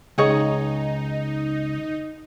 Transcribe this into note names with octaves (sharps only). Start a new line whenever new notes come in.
C#2 D#4 G#4 C#5 D#5